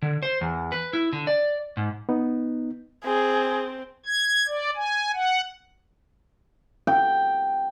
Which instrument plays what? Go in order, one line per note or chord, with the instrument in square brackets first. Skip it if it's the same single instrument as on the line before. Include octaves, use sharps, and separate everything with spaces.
[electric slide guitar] D3
C5
E2
B4
E4
D3
D5
G#2
[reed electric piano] B3 D#4
[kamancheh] C4 [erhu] G#4
[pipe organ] G#6
D5
G#5
F#5
[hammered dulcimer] G5